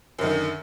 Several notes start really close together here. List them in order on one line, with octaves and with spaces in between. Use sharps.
F#2 D#3 D3